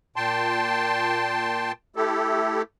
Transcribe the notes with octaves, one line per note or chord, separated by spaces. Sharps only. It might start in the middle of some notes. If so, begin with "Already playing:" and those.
A#2 G5 A5 C6
A3 E4 G4 A4